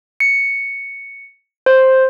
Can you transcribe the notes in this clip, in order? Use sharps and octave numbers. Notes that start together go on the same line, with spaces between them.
C#7
C5